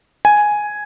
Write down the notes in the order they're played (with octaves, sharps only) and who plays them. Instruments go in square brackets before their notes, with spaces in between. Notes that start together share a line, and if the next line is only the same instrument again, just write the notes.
[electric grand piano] G#5